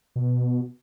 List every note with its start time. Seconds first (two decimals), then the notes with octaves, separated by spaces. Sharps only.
0.16 B2